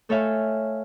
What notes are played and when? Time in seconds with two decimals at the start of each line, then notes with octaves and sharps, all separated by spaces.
0.09 A3 A4 C#5 E5 F5 G#5